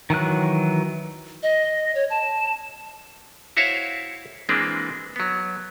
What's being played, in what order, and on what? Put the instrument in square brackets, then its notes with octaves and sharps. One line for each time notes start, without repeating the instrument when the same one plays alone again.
[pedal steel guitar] D#3 E3 F#3 F#6
[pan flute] D#5
C#5
A5
[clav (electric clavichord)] E4 F#4 C5 C#5 E5 F5
E3 G#3 A#3 C4 D4 B4
F#3 B3